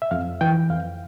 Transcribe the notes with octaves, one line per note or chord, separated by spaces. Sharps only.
E5
F2 F5
E3 G5
F2 F5